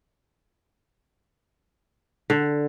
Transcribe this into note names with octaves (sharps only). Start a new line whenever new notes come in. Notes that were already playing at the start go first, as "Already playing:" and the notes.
D3